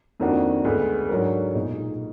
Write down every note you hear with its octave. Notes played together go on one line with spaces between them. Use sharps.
F2 D#3 A#3 D4 F#4
D2 D3 G#3 B3
G#2 F#3 D4 F#4 A#4
B1 A#2 G#3 D#4 G#4